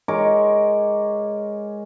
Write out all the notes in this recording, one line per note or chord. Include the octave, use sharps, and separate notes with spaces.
G#3 A#4 C#5 D6